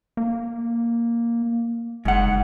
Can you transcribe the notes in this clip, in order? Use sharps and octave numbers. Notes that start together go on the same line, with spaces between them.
A#3
F#1 G#2 F#5